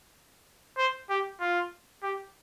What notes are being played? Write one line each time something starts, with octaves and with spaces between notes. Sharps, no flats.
C5
G4
F4
G4